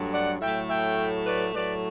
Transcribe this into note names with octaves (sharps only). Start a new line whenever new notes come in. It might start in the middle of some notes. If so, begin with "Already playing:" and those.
Already playing: G2 F#3 A3
D5 F#5
A2 F#3 A3 E5 G5
E5 G5
B4 D5
A2 F#3 A3 B4 D5